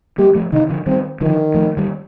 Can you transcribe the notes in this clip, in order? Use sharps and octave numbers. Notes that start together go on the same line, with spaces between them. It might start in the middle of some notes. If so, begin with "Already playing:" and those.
G3 A#3 G4
F3 A3
C3 D#3 D#4
D3 F3
D#3 G3 C4
D3 D#3 F3
F3 A3
D#3 G3